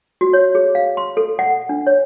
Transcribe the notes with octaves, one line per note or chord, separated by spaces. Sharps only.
F#4
C#5
G#4
F5
C6
A4
F#5
D4
C#5